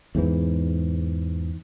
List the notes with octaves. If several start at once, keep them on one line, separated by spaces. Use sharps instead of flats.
E2 G#2 E3